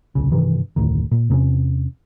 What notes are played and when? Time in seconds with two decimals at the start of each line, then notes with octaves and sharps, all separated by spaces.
0.15 D1 C2 C#3
0.32 G2 C3 D#3 E3
0.76 F1 D2 A2 D#3
1.11 A#2
1.30 E2 C3 A#3 C#4